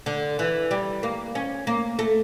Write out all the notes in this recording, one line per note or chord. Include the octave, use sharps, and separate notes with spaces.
D3
E3
G3
A#3
C#4
A#3
A3